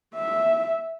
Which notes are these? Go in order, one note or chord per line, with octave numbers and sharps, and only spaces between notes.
E5